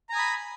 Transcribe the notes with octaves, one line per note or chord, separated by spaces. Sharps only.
G#5 A#5 B5 D#6